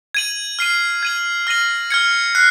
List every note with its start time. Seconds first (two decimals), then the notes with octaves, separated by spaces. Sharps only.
0.15 G#6 D#7 F#7
0.59 F6 C7 D#7
1.03 G#6 D#7 F#7
1.47 F6 A#6 D#7 F#7
1.91 F6 G#6 C#7
2.35 F#6 C7